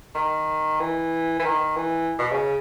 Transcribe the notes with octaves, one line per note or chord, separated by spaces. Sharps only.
D#3
E3
E3
D#3
E3
B2
C#3